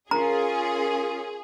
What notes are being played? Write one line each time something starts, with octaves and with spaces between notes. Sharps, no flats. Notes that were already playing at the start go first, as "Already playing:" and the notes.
C#4 F4 G#4 A#4 A#5